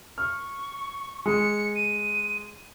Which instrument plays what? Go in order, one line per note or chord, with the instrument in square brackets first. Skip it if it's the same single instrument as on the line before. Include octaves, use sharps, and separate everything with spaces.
[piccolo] C#6 [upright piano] F6
[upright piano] G#3 [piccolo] C#7
[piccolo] D#7